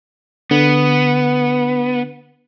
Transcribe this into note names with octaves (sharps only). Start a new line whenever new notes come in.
D3 B3